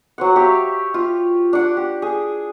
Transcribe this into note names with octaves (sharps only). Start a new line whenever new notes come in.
F#3 C5 F#5
G4 C#5 E5 F5
F4
D4 F#5
G4
G#4